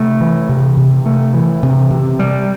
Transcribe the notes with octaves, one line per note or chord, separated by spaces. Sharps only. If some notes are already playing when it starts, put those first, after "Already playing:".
Already playing: C3 A3
E3
C3
C3
A3
E3
C3
C3
G3